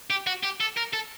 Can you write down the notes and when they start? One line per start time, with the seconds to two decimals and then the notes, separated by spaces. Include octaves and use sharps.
0.10 G4
0.27 F#4
0.44 G4
0.61 A4
0.77 A#4
0.94 A4